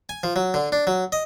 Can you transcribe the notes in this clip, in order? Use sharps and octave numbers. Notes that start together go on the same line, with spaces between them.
G#5
F3
F#3
D3
D4
F#3
D#5